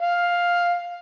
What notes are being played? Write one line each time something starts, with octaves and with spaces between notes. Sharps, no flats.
F5